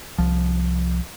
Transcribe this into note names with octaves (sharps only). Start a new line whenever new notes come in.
C2 F3